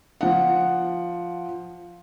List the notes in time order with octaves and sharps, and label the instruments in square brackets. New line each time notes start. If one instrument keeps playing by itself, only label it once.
[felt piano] F3 F#5